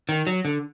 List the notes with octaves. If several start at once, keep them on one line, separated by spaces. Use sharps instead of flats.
D#3
F#3
D3